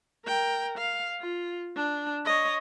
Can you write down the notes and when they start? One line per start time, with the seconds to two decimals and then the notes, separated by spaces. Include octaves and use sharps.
0.25 A#4 G5
0.78 F5
1.21 F4
1.76 D4
2.26 C#5 D#5